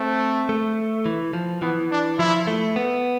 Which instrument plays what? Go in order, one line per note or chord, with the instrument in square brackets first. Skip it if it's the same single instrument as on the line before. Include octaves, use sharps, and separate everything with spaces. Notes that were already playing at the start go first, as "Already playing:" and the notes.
Already playing: [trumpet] A3 [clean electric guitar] C4
[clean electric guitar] A3
E3
F3
[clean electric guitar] E3 [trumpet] B3
[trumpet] D4
[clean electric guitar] F3 [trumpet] E4
[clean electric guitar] A3
B3